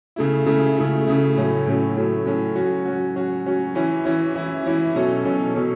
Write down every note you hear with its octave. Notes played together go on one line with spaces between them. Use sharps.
C#3 A3 E4
C#3 A3 E4
C#3 A3 E4
C#3 A3 E4
A2 F#3 A3 C#4
A2 F#3 A3 C#4
A2 F#3 A3 C#4
A2 F#3 A3 C#4
F#3 C#4 F#4
F#3 C#4 F#4
F#3 C#4 F#4
F#3 C#4 F#4
E3 C#4 E4
E3 C#4 E4
E3 C#4 E4
E3 C#4 E4
B2 F#3 C#4 A4
B2 F#3 C#4 A4
B2 F#3 C#4 A4